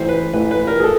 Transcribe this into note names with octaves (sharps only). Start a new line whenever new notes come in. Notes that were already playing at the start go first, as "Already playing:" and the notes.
Already playing: A1 A2 E3 C5
B4
A1 A2 E3 B4
B4
A#4
G#4
A4